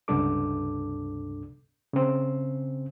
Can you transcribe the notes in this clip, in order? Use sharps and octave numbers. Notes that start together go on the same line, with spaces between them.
C#2 G2 C3 D4 A4 D6
C#3 C4